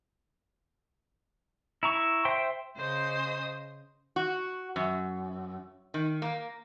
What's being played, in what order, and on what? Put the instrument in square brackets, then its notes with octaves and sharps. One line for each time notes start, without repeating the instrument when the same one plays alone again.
[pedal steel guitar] E4 A#5 C#6
C5 E5 G5 C6
[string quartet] C#3 C5 D#5 D#6
[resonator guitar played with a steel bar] F#4
F#2
D#3
A#3